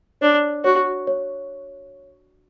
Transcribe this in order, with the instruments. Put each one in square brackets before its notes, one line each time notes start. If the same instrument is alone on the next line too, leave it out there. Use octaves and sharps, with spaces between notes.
[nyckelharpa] D4 [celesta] C#5
[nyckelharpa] F#4 [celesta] C#5
[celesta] C#5